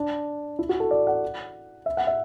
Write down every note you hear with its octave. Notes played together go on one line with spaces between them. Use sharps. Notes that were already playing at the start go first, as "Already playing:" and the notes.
Already playing: D4
E4
F#4
A4
D5
F#5
E5
F#5
E5